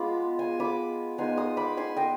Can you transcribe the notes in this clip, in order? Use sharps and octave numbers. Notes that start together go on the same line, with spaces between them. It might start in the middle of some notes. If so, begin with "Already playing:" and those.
Already playing: G#3 B3 F4 B5 D6
G#5 C6
B5 D6
G#3 B3 D#4 G#5 C6
C6 D#6
B5 D6
G#5 C6
D#5 G5